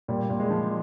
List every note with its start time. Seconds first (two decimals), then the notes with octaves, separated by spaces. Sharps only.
0.08 A#2 G3
0.30 A#2
0.39 G#3
0.50 F3